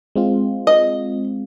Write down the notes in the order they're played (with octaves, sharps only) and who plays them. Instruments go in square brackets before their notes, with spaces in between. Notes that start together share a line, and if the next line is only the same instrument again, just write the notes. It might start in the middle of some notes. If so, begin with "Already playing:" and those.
[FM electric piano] G#3 C4 F4
[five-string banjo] D#5